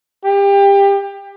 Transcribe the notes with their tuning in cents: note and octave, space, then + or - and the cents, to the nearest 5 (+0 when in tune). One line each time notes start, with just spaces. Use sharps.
G4 +25